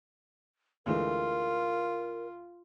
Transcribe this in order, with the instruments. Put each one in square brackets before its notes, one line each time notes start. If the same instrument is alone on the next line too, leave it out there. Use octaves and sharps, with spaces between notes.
[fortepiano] D2 E3 G#3 [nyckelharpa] F4 [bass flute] A#4